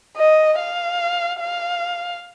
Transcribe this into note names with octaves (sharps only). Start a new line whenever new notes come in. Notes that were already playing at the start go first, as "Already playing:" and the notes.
D#5
F5
F5